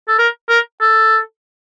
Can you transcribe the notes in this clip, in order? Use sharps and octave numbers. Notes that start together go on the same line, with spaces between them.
A4
A#4
A#4
A4